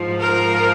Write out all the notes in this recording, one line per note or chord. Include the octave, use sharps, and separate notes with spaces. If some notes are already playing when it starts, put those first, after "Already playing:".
Already playing: G#2 F3
A#4